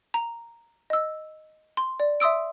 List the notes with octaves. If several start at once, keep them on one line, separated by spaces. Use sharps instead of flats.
A#5
D#5 E6
C6
D5
E5 C6 D#6 E6 D7